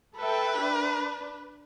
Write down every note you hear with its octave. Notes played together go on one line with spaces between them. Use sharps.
A4 B4 E5 G5
D4